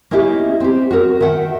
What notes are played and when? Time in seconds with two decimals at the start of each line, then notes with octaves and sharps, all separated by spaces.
0.11 A#3 C#4 D#4 E4 G4
0.60 C4 G4
0.91 F#4 A#4
1.20 D#3 E5 F#5 G5